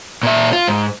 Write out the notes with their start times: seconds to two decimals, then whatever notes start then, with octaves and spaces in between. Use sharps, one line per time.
0.23 A#2 E5
0.53 F4
0.68 G#2